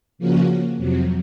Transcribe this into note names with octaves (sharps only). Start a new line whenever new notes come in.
C#3 F3 A#3 C#4 F#4
F2 C3 F#3